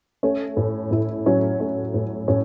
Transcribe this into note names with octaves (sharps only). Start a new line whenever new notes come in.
A3 C#4
A2
A2 E4
F#3 C#4
A3 C#4
A2
A2 C#4